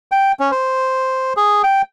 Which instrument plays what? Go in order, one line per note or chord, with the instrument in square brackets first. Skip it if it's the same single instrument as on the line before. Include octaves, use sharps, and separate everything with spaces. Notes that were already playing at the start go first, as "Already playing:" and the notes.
[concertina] G5
C#4
C5
G#4
G5